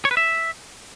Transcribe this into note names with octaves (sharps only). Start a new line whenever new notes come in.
C#5
B4
E5